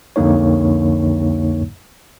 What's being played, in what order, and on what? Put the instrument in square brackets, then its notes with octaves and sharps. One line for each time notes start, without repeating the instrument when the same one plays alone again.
[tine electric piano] C2 F2 D3 A#3 D#4 C#5